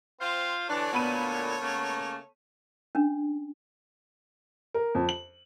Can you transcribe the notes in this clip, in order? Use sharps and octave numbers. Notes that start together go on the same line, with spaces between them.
C4 F4 C5 F5
D3 E3 D4 A4 C#5
D2 A#2 B3 B5 D#7
C#3 A3 A#3
C#4 D4
A#4
F2
F#7